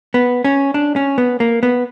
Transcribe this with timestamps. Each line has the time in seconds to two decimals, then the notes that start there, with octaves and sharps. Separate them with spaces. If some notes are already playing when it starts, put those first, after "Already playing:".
0.14 B3
0.44 C#4
0.74 D4
0.96 C#4
1.18 B3
1.40 A#3
1.63 B3